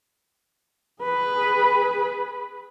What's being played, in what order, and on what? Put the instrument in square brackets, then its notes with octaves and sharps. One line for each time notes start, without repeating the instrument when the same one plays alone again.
[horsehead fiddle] G#4 B4